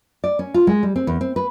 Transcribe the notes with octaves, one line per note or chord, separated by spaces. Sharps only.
D5
C#4
F4
G#3
G3
C4
E2
C4
B4